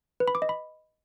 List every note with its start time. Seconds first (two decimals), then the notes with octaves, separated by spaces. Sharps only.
0.20 B4
0.28 B5
0.35 D6
0.42 D#5
0.49 B5